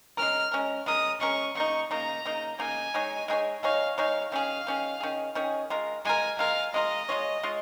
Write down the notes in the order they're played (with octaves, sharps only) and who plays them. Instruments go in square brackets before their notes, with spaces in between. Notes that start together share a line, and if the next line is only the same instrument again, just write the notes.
[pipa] G#3 C#4 A#4 [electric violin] F6
[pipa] G#3 C#4 A#4
[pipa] G#3 C#4 A#4 [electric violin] D#6
[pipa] G#3 C#4 A#4 [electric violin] C#6
[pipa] C#3 A#3 D#4 [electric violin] C#6
[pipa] C#3 A#3 D#4 [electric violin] A#5
[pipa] C#3 A#3 D#4
[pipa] C#3 A#3 D#4 [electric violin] G#5
[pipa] G#3 D#4 G#4 C#5
G#3 D#4 G#4 C#5
[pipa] G#3 D#4 G#4 C#5 [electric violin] F5
[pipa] G#3 D#4 G#4 C#5 [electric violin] F5
[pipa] D#3 C#4 G#4 [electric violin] F5
[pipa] D#3 C#4 G#4
D#3 C#4 G#4
D#3 C#4 G#4
G#3 F4 A#4
[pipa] G#3 F4 A#4 [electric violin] G#5
[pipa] G#3 F4 A#4 [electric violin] F5
[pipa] G#3 F4 A#4 [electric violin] D#5
[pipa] G#3 F4 C#5
G#3 F4 C#5